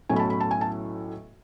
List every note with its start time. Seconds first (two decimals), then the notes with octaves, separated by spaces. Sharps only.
0.09 B1 A2 F#3 A3 C#4 G#5
0.16 B5
0.19 A5
0.30 B5
0.40 A5
0.51 G#5
0.61 A5